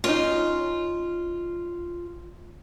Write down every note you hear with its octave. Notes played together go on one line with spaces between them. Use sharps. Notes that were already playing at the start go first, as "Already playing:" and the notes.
C#4 D#4 F4